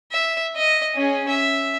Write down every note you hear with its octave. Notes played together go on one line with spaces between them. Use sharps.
E5
D#5
C#4 G#4
E5